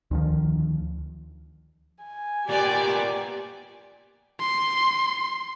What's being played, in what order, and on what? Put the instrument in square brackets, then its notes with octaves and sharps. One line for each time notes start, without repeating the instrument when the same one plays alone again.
[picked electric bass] D2 D#3 F3
[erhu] G#5
[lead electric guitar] A#2 B3 [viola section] G4 [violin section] D5
[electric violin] C6